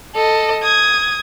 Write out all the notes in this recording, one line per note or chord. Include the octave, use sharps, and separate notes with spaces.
A4 D#5
D#6 G#6